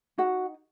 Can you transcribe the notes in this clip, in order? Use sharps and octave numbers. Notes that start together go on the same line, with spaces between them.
D#4 F#4 F#5